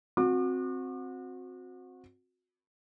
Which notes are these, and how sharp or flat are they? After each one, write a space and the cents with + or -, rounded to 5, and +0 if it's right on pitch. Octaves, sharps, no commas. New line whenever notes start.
C4 +0 F#4 -25 D6 +35